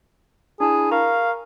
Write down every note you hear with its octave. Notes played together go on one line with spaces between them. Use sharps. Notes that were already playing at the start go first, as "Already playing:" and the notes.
D4 E4 G#4 A5
A#4 F5 A#5 C#6